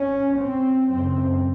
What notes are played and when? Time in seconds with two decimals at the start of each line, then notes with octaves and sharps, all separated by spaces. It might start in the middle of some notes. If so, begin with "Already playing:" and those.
Already playing: C#4
0.38 C4
0.89 F#2 C#3 C4